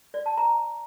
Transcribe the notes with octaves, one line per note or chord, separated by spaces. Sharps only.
D5
A5
A#5